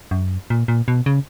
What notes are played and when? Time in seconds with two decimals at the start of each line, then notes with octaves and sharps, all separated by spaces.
0.11 F#2
0.50 A#2
0.68 A#2
0.88 B2
1.06 C#3